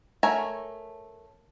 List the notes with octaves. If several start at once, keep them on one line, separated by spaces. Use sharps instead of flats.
A3 A#4 C#5 G#5